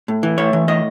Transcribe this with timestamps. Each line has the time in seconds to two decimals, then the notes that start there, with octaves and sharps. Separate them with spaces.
0.08 A2
0.23 E3
0.38 A2 C#5
0.53 E3
0.68 A2 D#5